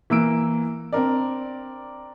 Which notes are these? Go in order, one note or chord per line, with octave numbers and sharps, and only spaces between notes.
E3 A#3 E6 D7
C4 D4 A#4 D5